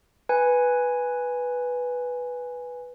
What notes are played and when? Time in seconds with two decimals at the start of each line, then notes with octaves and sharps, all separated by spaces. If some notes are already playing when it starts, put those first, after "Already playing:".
0.29 B4 G#5